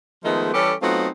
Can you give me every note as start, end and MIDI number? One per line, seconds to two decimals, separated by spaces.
0.24 0.52 51
0.24 0.52 53
0.24 0.52 56
0.24 0.52 57
0.24 0.52 59
0.24 0.52 63
0.53 0.73 52
0.53 0.73 55
0.53 0.73 61
0.53 0.73 67
0.53 0.73 69
0.81 1.08 54
0.81 1.08 57
0.81 1.08 59
0.81 1.08 60
0.81 1.08 63
0.81 1.08 65